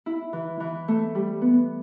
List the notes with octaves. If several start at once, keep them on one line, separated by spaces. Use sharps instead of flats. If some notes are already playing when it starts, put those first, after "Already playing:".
E4
E3
E3
A3
G3
B3